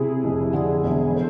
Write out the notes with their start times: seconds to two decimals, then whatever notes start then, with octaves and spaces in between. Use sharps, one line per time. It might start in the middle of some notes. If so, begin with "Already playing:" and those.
Already playing: C3 E4 G#4
0.24 F1
0.54 D3
0.84 E1
1.14 A4 C5